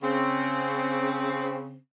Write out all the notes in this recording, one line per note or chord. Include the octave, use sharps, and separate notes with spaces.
C#3 C4